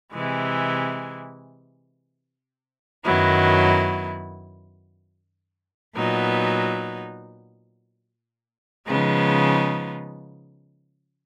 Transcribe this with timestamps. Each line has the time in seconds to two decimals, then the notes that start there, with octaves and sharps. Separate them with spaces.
0.13 C3 E3 G#3
3.04 F#2 D#3 F#3 B3 E4
5.96 A#2 F#3 B3 D#4
8.87 C#3 F3 G#3 B3 D#4